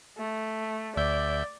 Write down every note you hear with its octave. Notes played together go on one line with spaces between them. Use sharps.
A3
D2 D5 E5 G6